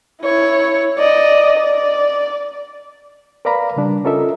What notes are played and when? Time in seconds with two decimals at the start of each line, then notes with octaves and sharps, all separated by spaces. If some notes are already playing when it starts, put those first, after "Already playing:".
0.22 E4 C#5
0.98 D5 D#5
1.58 D5
3.45 A#4 B4 D5 F5 A#5 B5
3.76 C#3 G3 D4
4.05 C#4 F4 A4 A#4 D#5 E5